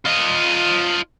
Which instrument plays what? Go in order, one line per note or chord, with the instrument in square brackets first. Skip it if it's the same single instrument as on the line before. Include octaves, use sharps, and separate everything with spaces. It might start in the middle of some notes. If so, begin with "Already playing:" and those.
[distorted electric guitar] F4 D#5